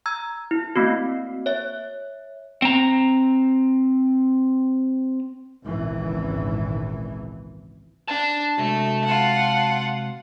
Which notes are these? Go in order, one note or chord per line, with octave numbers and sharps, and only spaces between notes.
A#5 E6 G#6
E4
A3 A#3 C4 F#4
C#5 E5
C4 A#5
G#1 C#2 A#2 E3
D4 A5
C3 G#3 A3 F#4
F4 F#5